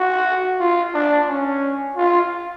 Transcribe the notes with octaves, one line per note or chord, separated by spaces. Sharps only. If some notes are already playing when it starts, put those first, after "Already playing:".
Already playing: F#4
F4
D4
C#4
F4